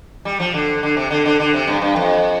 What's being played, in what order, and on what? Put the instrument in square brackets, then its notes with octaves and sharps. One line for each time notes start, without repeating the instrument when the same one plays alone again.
[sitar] G3
F3
D3
D3
C3
D3
D3
D3
C3
G2
G2
F2